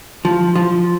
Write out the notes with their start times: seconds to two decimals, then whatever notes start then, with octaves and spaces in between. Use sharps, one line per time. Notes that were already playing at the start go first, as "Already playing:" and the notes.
0.25 F3
0.56 F3